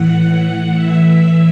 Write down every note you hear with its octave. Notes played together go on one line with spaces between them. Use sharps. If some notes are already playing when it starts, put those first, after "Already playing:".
Already playing: A2 E3 F#5
A2 E3 F#5
A2 E3 E5
A2 E3